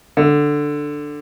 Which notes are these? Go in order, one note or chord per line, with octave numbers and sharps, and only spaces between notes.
D3